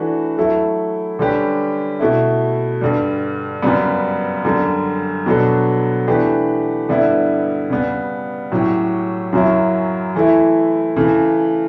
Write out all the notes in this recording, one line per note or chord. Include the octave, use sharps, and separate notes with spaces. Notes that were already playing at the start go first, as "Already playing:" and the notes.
Already playing: E3 A3 D4 F#4 B4
F#3 A3 E4 A4
D3 G3 C#4 G4 B4
B2 A3 E4
G2 D3 G3
F#2 C#3 G3 B3
F#2 D3 G3
B2 F#3 B3 D4 A4
E3 A3 D4 G4 B4
G2 D3 G3 B3 E4
C#3 G3 B3
A2 F#3 C#4 G4
F#2 C#3 F#3 C#4 E4
E3 A3 E4
C#3 E3 A3